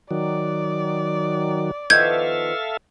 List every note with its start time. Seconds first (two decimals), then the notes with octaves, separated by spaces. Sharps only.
0.11 D#3 F#3 D5
1.90 D#3 F3 B3 A4 E5 F5 G6 G#6